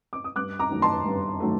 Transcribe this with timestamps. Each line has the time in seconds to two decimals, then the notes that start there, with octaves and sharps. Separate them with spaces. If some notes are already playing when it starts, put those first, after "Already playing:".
0.13 D6
0.24 D#6
0.36 G2 D6 F#6
0.59 A#5 D6
0.71 D#3 F#3 A3
0.82 A5 C6
1.05 G2
1.40 D#3 F#3 A3